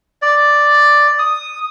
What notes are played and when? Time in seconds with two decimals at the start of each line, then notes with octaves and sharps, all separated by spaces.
0.22 D5
1.19 D#6